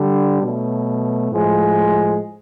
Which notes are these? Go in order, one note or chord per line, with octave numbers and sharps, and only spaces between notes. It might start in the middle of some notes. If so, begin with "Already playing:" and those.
Already playing: D3 G3
B2 F#3 A3
A2 F3 G#3